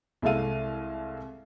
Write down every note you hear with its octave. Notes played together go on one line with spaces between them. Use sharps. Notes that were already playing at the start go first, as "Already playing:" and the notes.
C2 G#3 A4 E5 F5 D#7